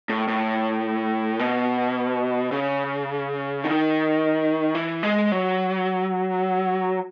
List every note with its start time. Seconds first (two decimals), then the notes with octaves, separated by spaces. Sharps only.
0.09 A2
0.28 A2
1.39 B2
2.52 C#3
3.64 D#3
4.75 E3
5.03 G#3
5.32 F#3